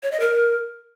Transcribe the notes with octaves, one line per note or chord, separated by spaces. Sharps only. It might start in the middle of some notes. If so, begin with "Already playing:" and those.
C#5
D#5
A#4